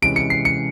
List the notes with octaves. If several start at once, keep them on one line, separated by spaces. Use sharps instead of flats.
C3 E3 G#3 C#4 E4 D7
C#7
C7
C#7